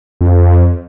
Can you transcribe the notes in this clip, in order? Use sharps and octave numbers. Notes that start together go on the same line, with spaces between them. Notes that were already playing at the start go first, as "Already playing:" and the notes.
F2